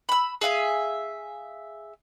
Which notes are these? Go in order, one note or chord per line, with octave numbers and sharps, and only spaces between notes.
B5 E6
G#4 E5 F5 G#5